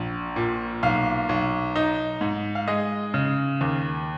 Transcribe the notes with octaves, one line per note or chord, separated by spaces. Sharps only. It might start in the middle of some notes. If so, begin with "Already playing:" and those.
Already playing: A#1
A#2
B1 F5
B1
D#4
G#2
F5
G#3 D#5
C#3
D#2